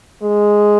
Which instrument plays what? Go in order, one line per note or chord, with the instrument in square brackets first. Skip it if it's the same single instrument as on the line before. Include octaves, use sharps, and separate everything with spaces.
[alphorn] G#3